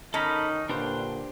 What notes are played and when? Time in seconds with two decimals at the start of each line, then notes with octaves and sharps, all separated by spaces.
0.14 D#3 C#4 D#4 A4 A#5 B5
0.69 A#2 D3 A#3 D4 G4 B4 C5